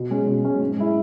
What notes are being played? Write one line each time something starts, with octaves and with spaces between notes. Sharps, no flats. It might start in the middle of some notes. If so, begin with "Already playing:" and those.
Already playing: B2
G#3 C#4
B2
G#3 C#4
G#2
G#3 E4